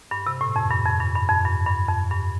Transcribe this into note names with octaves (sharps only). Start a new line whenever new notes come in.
G2
C3
A2
F2
G2
F2
G2
G2
F2
G2
G2
F2
G2